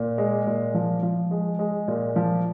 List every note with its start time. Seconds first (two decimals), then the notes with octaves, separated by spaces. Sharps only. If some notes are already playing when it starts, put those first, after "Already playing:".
Already playing: A#2
0.18 G#3
0.47 A#2
0.74 F3
1.03 F3
1.31 G#3
1.59 G#3
1.88 A#2
2.16 F3